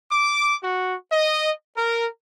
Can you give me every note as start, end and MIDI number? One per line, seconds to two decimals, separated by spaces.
0.10 0.55 86
0.63 0.94 66
1.11 1.50 75
1.76 2.06 70